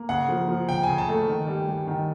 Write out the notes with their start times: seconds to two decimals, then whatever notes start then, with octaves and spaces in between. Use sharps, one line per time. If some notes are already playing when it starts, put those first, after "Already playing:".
Already playing: A#3
0.09 C#3 F#5
0.29 F3
0.48 F3
0.68 C#3 G5
0.83 C#3 G#5
0.98 A5
1.09 A3
1.28 D#3
1.47 G3
1.68 G3
1.87 D#3